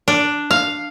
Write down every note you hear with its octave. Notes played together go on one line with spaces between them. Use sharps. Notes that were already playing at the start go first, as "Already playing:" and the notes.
D4
F5